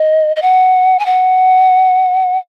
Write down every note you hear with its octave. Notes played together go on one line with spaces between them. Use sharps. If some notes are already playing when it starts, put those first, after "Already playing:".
Already playing: D#5
D#5
F#5
G#5
F#5